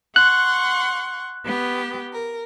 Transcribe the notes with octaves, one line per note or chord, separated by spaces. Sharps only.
F#5 C6 C#6 F#6
B3 G4
A#4